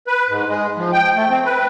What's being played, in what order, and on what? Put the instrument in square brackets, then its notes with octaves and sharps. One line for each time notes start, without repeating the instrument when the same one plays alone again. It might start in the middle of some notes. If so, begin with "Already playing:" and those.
[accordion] B4
G#2
G#3
F3
G5
A3
C4
B4